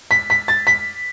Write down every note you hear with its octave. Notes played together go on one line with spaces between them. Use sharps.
B6
B6
A6
B6